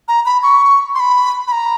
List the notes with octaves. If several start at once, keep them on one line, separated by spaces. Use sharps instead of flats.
A#5
B5
C#6
C6
B5
B5
A#5